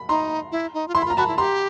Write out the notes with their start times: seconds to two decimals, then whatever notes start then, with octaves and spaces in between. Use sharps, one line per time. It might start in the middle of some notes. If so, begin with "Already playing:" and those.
Already playing: B5
0.09 D#4 A#5 C6
0.52 E4
0.74 D#4
0.88 F4
0.95 E4 C6
1.02 B5
1.05 F4
1.10 A#5
1.16 F#4 A5 B5
1.28 E4
1.38 G4 A#5 C6